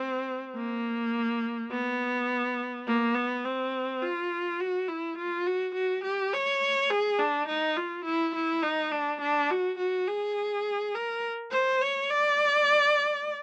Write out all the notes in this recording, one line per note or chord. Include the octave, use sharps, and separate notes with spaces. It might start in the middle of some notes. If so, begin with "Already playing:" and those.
Already playing: C4
A#3
B3
A#3
B3
C4
F4
F#4
E4
F4
F#4
F#4
G4
C#5
G#4
D4
D#4
F4
E4
E4
D#4
D4
D4
F#4
F#4
G#4
A#4
C5
C#5
D5